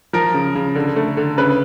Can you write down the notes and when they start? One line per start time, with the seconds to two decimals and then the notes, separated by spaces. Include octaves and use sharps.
0.13 F3 A#4
0.34 C#3
0.55 C#3
0.76 D3
0.96 A3
1.17 D3
1.38 C#3 B4